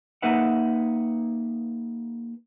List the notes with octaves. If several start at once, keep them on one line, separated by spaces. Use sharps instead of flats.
A#3 D#4 G#4 B4 E5 F#5